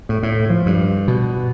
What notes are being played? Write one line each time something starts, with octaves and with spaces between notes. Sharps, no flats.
A2
A2
F3
G2
B2